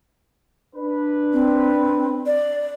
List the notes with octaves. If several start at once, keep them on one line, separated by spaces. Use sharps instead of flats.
D4 B4
C4
D5